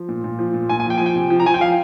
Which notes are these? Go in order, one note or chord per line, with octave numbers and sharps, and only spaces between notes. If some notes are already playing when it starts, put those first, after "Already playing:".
Already playing: F3
A#2
A#2
F3
A#2
A#2 G#5
G#5
F3 G5
F3 G#5
G5
C3
F3
A#5
F3 G#5
G5
F3 F5